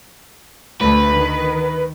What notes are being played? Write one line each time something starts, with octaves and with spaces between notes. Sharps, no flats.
D2 A3 B4
D#3